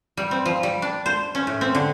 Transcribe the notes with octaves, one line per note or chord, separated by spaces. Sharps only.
G3
C4
F3
G3
D4
C5
C#4
A2
C4
D3